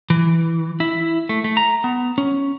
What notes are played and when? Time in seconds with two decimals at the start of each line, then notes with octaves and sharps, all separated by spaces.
0.10 E3
0.80 E4
1.29 A3
1.44 A3
1.57 A#5
1.84 B3
2.18 C#4